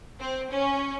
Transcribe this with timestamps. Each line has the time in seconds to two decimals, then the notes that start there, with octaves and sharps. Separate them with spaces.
0.19 C4
0.51 C#4